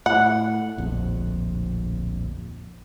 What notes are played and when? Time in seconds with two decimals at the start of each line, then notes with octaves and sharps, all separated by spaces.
0.06 A2 F#5
0.77 D1 A#1 F2